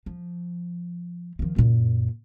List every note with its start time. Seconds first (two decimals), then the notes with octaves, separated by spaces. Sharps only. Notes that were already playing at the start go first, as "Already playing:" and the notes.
0.06 F3
1.39 D#3 F3
1.56 F#2 A#2